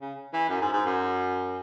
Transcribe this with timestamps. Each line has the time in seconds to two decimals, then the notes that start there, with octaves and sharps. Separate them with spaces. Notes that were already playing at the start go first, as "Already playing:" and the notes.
0.01 C#3
0.33 E3
0.49 F#2
0.62 G#2
0.73 G#2
0.85 F#2